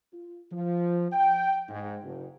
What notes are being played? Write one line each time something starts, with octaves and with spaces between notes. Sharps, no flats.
F4
F3
G5
G#2
F#1